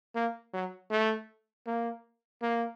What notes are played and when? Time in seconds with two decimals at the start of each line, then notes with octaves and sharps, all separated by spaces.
0.15 A#3
0.53 F#3
0.91 A3
1.67 A#3
2.42 A#3